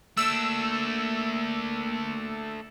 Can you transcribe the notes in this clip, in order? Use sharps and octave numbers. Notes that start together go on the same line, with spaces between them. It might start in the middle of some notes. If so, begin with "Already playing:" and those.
A3 A#3 D4 E6